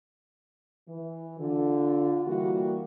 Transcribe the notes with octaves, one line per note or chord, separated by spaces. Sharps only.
E3
D3 F4
E3 G3 A#3 F#4